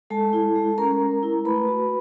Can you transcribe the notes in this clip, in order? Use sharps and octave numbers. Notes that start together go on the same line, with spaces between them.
G#3 A4 A5
E4
G#3
C#4 A#4 A#5
G#3
E4
A3 B4 B5
F#4